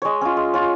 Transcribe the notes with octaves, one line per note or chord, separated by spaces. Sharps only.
G#3 C#5 D#5
C#4 F4
G#3
C#4 F4